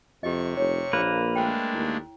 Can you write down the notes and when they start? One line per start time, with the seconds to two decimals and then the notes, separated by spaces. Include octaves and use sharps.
0.23 F2 C3 G4 D#5 C#6
0.57 F1 C#5
0.93 A#1 A#3 B4
1.36 G#3 A3 D4 G5
1.75 D#2 E4